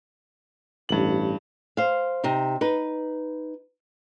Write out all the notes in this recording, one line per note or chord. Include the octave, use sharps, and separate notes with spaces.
A1 G2 F#7
C5 F5
C3 D#4
D#4 B4